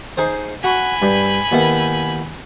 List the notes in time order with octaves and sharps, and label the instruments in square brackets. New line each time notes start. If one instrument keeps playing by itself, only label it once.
[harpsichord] D#4 G#4 C5
[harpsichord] F#4 [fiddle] G#5 B5
[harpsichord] G2
D#2 B3 E4